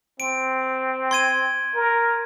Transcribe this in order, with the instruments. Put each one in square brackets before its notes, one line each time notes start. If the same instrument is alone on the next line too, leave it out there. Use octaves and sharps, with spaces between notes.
[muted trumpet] C4 [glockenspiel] D7
[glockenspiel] C6 G#6 D#7
[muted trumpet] A#4